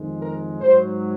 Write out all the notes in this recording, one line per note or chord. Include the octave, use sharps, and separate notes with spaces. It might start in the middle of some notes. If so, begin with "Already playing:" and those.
Already playing: F2 D#3 G#3
A#4
G#2 F#3 C5